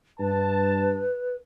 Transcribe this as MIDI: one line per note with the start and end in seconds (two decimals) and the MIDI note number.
0.20 1.04 43
0.20 1.37 71
0.20 1.04 81